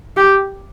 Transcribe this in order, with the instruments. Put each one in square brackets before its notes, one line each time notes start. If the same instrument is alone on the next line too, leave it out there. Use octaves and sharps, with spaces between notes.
[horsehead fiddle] G4